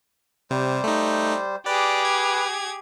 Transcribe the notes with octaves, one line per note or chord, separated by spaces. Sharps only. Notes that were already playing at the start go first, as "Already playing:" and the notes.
C3 G3 C5
A3 D#4
G4 G#4 B4 D5
G#6